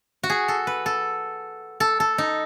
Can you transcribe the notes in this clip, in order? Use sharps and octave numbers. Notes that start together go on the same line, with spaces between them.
F#4
G#4
A4
B4
A4
A4
A4
D#4